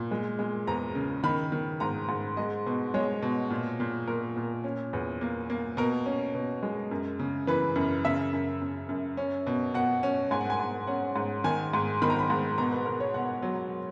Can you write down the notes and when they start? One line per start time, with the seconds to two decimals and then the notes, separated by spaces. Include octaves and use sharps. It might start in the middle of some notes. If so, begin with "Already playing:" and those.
Already playing: A#2
0.11 G#3
0.39 G#3
0.67 E2 A#5
0.95 C#3
1.24 D#3 B5
1.52 D#3
1.80 G#2 A#5
2.09 G#2
2.37 G#3 D#5
2.66 B2
2.94 G#3 C#5
3.22 B2
3.50 A#2
3.80 A#2
4.07 A#2 A#4
4.37 A#2
4.64 C#4
4.93 E2
5.21 A#3
5.50 A#3
5.77 B2 A#4
6.06 C#4
6.35 B2
6.63 G#3
6.91 F#2
7.19 C#3
7.47 E3 B4
7.76 F#2
8.05 C#3 E5
8.33 F#2
8.61 C#3
8.89 F#2
9.17 C#4
9.47 B2
9.74 B2 F#5
10.03 C#4
10.31 G#2 G#5
10.41 F#5
10.50 G#5
10.60 G#2
10.87 C#4 F#5
11.16 G#2
11.44 D#3 G#5
11.73 G#2
12.02 D#3 B5
12.10 A#5
12.19 B5
12.30 G#2
12.58 B2 A#5
12.72 B4
12.86 B2 A#4
13.00 C#5
13.14 B2 F#5
13.42 F#3